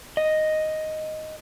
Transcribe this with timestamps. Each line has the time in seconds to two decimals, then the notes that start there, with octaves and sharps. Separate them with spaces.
0.17 D#5